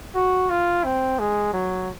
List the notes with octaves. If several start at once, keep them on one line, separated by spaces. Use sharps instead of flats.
F#4
F4
C4
G#3
F#3